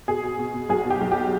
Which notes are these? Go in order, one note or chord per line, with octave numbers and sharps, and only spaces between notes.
B2 G#4
B2
B2
B2
B1 G#4
B2
G4
B1
G4